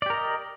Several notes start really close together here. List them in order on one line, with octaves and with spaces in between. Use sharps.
D5 G4 A#4 D#5